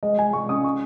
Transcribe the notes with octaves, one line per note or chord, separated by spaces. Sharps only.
G#3 D#5
G#3 G#5
G#3 C#6
C#4 D#6
C#6